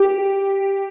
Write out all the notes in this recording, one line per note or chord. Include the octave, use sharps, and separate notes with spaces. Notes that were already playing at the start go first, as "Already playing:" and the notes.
Already playing: G4